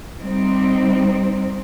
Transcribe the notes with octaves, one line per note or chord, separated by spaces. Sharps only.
G3 C4 D#4